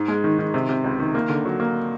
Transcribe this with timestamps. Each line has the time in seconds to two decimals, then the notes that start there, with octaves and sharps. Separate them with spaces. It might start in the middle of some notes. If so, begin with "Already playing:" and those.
Already playing: G#2
0.08 G#3
0.24 D#3
0.39 D#3
0.54 C3
0.69 C3
0.84 C#2
0.99 D#3
1.15 A#3
1.29 D3
1.45 F#3
1.60 A#3